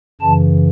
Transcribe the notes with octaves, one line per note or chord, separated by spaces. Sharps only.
F#2 C#3 E3 A5